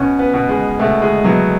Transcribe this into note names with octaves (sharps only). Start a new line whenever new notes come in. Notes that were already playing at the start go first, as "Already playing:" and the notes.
Already playing: B2 C#4
B3
B2
G#3
B2 A3
G#3
B2 F#3